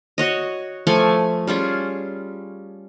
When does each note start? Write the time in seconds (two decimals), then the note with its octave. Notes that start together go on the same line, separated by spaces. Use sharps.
0.18 F#4 C#5 D#5
0.87 F3 A3 G#5 C#6
1.47 G3 C#4 F4 G#4